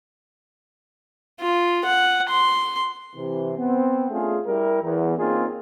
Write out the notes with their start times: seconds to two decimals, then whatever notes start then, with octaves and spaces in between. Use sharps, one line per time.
1.40 F4
1.85 F#5
2.29 C6
3.16 C3 E3
3.58 B3 C4
4.10 A3 C#4 D4 F4 G#4
4.46 G3 E4 G4 A#4
4.83 E2
5.17 A#3 C4 C#4 D#4 F4 G#4